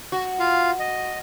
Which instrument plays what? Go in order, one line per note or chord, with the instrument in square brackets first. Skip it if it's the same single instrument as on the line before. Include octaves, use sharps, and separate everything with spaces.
[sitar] F#4
[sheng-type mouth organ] F4 F5
D#5